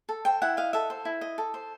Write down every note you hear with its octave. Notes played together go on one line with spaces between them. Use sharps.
A4
C5 G5
E4 F#5
D#5 F5
A4 E5
C5
E4
D#5
A4
C5